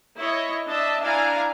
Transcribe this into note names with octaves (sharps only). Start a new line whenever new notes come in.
E4 C#5 D#5
D4 D#5 E5 A5
D4 E4 F5 G#5 A#5